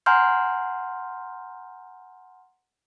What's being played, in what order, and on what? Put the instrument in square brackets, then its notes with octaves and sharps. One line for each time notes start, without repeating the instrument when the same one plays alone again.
[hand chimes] F#5 G#5 A#5 C6 F6 G6